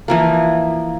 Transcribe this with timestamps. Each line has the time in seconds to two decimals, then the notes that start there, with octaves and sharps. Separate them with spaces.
0.08 E3 F3 A#3